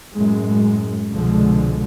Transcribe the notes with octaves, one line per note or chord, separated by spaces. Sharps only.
F#2 A2 G#3
C2 B2 D3 F3 G#3